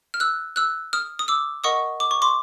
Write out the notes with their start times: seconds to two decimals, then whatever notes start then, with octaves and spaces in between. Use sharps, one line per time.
0.14 F6
0.20 E6 F#6
0.56 E6 F#6
0.93 D#6 F6
1.19 D#6
1.28 D6 E6
1.64 A#4 D#5 F#5 C#6 D#6
2.00 D6
2.11 C#6
2.22 C6 D6